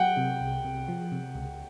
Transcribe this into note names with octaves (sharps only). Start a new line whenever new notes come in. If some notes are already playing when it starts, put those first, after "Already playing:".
Already playing: F#3 F#5 G5
C3
C2
C3
F3
C3
C#2